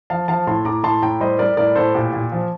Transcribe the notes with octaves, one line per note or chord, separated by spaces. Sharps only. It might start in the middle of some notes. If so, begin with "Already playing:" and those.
F3 F5 A5
F3 F5 A5
A2 A5 C6
A2 A#5 D6
A2 A5 C6
A2 G5 A#5
G3 C5 D#5
G3 A#4 D5
A2 A#4 D5
A2 A4 C5
A#2 G4
A#2
F3